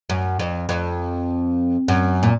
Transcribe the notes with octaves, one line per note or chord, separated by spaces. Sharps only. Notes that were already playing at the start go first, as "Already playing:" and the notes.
F#2
F2
F2
F#2
A#2